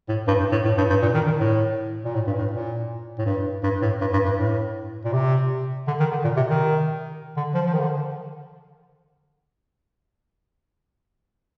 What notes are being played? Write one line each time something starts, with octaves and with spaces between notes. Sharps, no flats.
A2
G2
G2
A2
A2
G2
G2
A#2
D#3
D#3
A2
A#2
A2
G2
A2
A#2
A2
G2
G2
A2
G2
G2
G2
A2
A#2
C3
D3
D#3
D3
A#2
C3
D#3
D3
F3
F3
D#3
D3